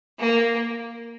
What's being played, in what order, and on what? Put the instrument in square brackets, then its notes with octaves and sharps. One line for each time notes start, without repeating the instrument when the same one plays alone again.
[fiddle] A#3